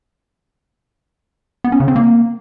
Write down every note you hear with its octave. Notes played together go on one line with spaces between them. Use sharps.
B3
C#4
C#3
C4
A#3